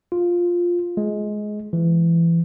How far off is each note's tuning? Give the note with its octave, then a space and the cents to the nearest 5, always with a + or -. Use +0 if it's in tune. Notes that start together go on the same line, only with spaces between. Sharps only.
F4 +5
G#3 +15
E3 +25